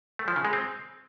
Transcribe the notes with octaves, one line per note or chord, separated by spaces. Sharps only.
A3
F3
C#3
G#3
C4